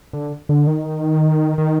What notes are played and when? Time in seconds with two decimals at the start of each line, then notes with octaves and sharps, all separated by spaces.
0.13 D3
0.49 D3
0.67 D#3
1.58 D#3